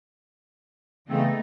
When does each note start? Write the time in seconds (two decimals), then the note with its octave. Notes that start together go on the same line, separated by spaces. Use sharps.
1.08 C#3 E3 A3 B3 C4 D#4